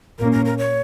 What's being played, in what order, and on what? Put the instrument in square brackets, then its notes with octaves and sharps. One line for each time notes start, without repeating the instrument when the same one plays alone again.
[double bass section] A#2 A#3 C#4 [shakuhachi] A#4
[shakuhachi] A#4
A#4
C#5